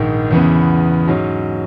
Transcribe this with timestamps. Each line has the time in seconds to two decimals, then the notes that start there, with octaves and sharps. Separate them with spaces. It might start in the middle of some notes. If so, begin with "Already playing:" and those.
Already playing: A#1 G#2 D#3
0.31 E2 C#3 E3 B3
1.08 G#2 F#3 C#4